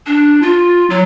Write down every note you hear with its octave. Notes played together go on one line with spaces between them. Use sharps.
D4
F4
F#3